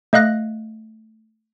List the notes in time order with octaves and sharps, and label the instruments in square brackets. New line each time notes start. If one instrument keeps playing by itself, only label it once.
[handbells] A3 D#5 F5 F#6 A#6